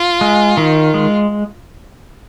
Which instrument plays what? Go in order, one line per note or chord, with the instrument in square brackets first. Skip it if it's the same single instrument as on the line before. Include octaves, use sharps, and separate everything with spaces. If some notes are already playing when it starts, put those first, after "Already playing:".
Already playing: [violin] F4
[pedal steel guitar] G#3
D#3
G#3